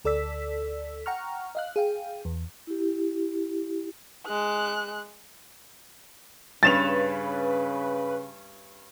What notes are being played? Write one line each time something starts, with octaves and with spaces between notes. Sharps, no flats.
D2 A4 D5 E6 B6
F#5 G5 A#5 C#6 F6
D#5 F5 F#6
G#4 F5 G5
E2
E4 G4
G#3 F#6
G2 C#3 C#4 B4 A6 E7 F7